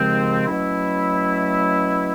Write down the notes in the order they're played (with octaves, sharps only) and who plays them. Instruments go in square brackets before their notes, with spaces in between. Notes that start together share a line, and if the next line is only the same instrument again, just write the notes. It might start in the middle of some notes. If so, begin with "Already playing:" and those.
Already playing: [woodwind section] D#2 C#3 F3 G#3 C4
B2 F#3 A3 C#4 E4